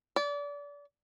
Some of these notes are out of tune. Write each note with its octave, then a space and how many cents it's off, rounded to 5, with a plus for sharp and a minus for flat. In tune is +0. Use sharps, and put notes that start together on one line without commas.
D5 -30